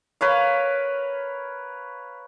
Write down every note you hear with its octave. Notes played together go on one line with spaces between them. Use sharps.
A#4 B4 C#5 F5